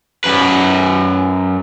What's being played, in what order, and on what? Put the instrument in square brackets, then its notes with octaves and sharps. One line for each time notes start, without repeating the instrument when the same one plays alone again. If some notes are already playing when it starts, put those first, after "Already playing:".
[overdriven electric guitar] F#2 B4